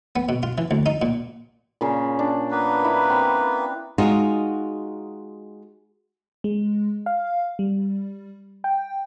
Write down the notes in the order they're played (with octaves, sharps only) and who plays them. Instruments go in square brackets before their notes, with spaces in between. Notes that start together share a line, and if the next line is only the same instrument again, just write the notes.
[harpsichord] B3
B2
F4
E3
D2
D#4
A#2
[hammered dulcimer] A#2 C#3
D4
[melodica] A#3 B3 B4
[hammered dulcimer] E4
C4
[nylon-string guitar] G#3 D#4 F4 F#4
[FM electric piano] G#3
F5
G3
G5